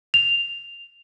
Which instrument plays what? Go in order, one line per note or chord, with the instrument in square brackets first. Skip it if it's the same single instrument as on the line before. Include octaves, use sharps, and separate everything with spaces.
[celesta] F7